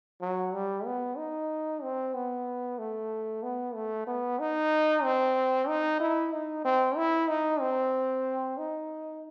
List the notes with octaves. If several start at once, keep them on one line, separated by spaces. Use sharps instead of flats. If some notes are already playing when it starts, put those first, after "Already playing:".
F#3
G3
B3
D#4
C4
B3
A3
B3
A3
B3
D#4
C4
D#4
E4
D#4
C4
E4
D#4
C4
D#4